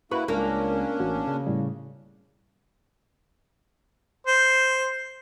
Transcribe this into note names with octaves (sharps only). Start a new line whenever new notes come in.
A#3 E4 F#4 B4 C#6
C#2 A#3 C#4 D4
A1 F#4
C#3
A2 G3
C5